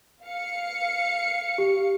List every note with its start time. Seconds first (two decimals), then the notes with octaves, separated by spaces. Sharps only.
0.24 F5 C#7
1.58 G4